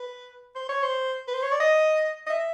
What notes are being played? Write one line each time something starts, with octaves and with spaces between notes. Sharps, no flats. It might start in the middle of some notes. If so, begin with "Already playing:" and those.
Already playing: B4
C5
C#5
C5
B4
C5
C#5
D5
D#5
D#5
E5